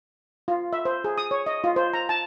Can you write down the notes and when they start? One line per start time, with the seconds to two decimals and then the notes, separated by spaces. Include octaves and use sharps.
0.48 F4
0.73 E5
0.85 C5
1.04 G#4
1.18 D#6
1.31 C#5
1.46 D#5
1.64 F4
1.76 C5
1.93 A#5
2.09 A5